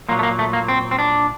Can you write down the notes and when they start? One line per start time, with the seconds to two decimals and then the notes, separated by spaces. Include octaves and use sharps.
0.09 A#2 F#3 A#3
0.19 A3
0.23 A#3
0.39 A3
0.53 A#3
0.68 C4
0.91 C4
0.99 D4